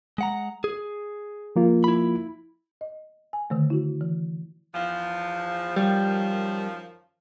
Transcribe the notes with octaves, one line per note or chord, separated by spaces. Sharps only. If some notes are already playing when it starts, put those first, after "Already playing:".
G#3 F#5 A#5
G#4
F3 A#3 F4
E4 B5
D#5
G#5
D3 D#3 A3
E4 F#4
E3
E2 F3
F#2 D#3 F3 G3